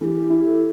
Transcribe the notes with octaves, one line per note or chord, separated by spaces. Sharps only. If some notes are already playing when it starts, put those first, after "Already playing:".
E3 G4 A4
E4
A4